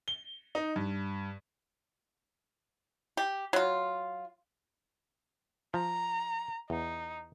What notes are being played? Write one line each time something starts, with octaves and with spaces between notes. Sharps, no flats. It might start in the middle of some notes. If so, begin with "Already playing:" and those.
G7
D#4
G2
G4
F#3 F4
F3 A#5
E2 D#4